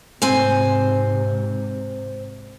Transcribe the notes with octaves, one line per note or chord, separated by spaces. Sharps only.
G#2 C3 C4 C5 G#5